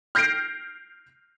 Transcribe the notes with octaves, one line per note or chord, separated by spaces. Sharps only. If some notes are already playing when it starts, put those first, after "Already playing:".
F6 G6 A#6 C7 D7